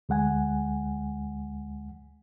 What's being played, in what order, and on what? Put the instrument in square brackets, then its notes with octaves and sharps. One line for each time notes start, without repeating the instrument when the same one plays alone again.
[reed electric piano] D2 G#3 F#5 G#5